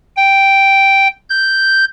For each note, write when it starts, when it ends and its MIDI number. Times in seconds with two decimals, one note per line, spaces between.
0.16 1.08 79
1.30 1.85 91